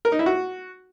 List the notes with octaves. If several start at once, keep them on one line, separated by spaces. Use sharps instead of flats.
A#4
D#4
E4
F#4